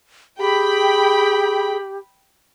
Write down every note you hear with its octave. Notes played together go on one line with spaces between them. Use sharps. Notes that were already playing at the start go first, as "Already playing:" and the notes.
G4 G#4 G5 B5